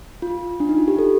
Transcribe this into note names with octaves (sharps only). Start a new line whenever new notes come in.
F4
D4
D#4
F4
G4
A4